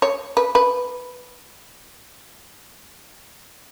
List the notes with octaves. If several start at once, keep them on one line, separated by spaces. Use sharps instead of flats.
C#5
B4
B4